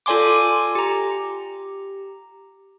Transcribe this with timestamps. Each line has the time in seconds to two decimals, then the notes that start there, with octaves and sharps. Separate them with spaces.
0.06 F4 A4 D5 G#5 C6 D6
0.75 G4 A#5